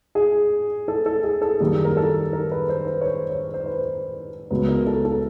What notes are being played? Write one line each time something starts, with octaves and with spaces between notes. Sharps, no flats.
G#4
A4
A4
G#4
A4
F#2 D#3 G3 A#3 G#4
A#4
A4
A#4
B4
C5
B4
C#5
C5
C#5
C5
B4
C5
C#2 C#3 F#3 B3 B4
A#4
A4
A4